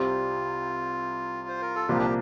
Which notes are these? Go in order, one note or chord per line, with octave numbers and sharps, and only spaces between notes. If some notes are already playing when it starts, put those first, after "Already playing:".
Already playing: C2 C3 G3 C4 F4
C5
A#4
A4
C2 A#2 F3 A#3 G4
D4